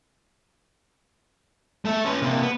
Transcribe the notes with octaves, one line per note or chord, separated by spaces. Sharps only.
A3 E5
C#4 B4
C3 A#3
B3